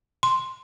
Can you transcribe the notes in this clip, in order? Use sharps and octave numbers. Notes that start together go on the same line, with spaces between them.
C6